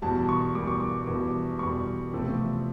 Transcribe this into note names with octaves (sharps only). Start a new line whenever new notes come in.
E2 B2 G3 A5
C#6
E2 B2 G3 D6
C#6
D6
E2 B2 G3
E2 B2 G3 C#6
E2 C3 F3 A3 C4